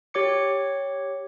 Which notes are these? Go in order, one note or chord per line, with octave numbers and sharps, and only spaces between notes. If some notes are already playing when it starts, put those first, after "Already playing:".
G4 C#5 D6 C#7